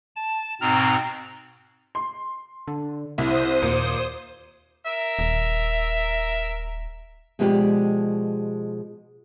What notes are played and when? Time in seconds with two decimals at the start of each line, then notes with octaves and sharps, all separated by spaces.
0.16 A5
0.61 G#2 B2 C4 A#5 F6
1.95 C6
2.67 D3
3.18 C2 E4 C5 D#6
3.62 D#2 A#2
4.86 A#4 E5
5.19 D#1
7.39 B2 F3 G#3 G4 A#4 D5